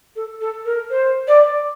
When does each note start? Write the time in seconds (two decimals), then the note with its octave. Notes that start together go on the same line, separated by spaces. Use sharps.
0.16 A4
0.41 A4
0.65 A#4
0.90 C5
1.28 D5